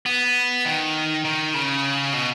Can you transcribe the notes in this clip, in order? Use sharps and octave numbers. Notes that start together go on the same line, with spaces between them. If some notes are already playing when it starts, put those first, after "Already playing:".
B3
D#3
D#3
C#3
B2